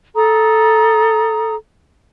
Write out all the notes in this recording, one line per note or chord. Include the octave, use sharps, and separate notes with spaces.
A4 A#5 D#6